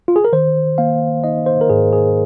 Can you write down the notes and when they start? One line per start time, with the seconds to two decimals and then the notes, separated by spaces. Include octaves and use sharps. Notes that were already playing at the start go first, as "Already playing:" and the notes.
0.08 F4
0.16 G#4
0.25 A#4
0.33 D#3 C5
0.78 A#3 F5
1.24 D#4 D#5
1.46 C5
1.61 A#4
1.70 G#2 G#4
1.93 G#4